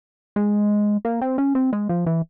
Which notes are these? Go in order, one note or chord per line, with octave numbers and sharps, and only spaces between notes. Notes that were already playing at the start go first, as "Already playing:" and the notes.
G#3
A#3
C4
C#4
C4
G#3
F3
E3